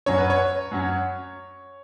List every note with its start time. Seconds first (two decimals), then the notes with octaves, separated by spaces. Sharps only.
0.06 F#2 F#3 C#4 C#5
0.18 B4
0.30 C#5
0.71 F#2 F#3 C#4